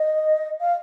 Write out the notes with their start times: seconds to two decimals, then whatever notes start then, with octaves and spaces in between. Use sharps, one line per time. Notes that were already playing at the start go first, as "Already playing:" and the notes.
Already playing: D#5
0.61 F5